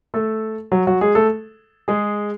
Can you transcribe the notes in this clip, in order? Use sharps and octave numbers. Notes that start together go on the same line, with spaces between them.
A3 A4
F#3 F#4
F#3 F#4
G#3 G#4
A3 A4
G#3 G#4